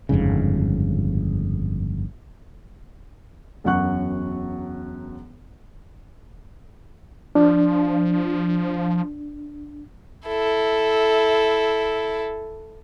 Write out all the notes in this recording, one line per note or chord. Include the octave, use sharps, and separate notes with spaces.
G1 F2 G#2 C#3
E1 F#2 F#3 F#5 C#6 F#6
F3 D4
E4 A4